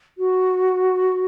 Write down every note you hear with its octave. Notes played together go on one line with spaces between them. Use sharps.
F#4